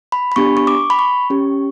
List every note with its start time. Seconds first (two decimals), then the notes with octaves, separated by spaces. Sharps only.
0.12 B5
0.32 B5
0.36 B3 D4 G4 C#6
0.57 C#6
0.67 D6
0.90 B5
0.99 C#6
1.30 C#4 G4